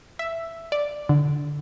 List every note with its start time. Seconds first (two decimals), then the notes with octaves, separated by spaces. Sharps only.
0.19 E5
0.72 D5
1.09 D3